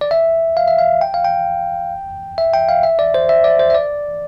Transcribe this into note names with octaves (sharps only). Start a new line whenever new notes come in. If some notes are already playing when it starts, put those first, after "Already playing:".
D5
E5
F5
E5
F5
G5
F5
G5
E5
G5
F5
E5
D5
C5
E5
D5
C5
E5
D5